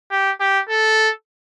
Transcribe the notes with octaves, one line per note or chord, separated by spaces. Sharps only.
G4
G4
A4